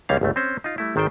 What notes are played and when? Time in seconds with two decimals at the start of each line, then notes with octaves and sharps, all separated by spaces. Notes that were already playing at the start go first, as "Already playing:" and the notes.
0.09 C#2 G3 C#4 F5
0.21 G1 C#2 A3
0.36 C4 C#4 C5
0.64 D#4 F4
0.78 G3 A3 E4
0.96 G#1 D#3 A4 C5 G5